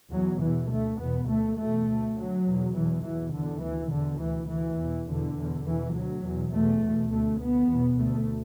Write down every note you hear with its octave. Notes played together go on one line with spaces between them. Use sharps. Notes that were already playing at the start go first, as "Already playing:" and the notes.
E2 B2 F#3
E2 B2 E3
D2 A3
E2 B2 B3
D2 A3
E2 B2 A3
D2
D2 F#3
E2 B2
E2 B2 E3
E2 B2 E3
E2 B2 D3
D2 E3
E2 B2 D3
D2 E3
D2 E3
E2 B2
E2 B2 D3
E2 B2
E2 B2 E3
D2 F#3
E2 B2
E2 B2 A3
E2 B2
D2 A3
D2 B3
E2 B2
D2 A3